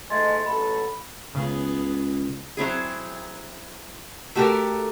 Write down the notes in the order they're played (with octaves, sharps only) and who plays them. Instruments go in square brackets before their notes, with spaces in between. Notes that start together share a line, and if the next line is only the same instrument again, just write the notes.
[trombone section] G#2 G#3 A3 [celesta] D#5 C6 A6
[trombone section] A1 F#3 A4 [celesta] B5
[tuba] C#2 [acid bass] C#3 [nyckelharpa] B3 G#4
[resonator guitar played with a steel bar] F#3 C4 E4 G#4
A3 F#4 G4 A4 A#4